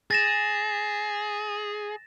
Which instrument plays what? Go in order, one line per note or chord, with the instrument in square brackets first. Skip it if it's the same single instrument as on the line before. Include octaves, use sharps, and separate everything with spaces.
[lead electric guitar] G#4 [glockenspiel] A6 A#6 E7